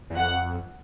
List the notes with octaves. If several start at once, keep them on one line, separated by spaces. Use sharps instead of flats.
E2
F2 F#5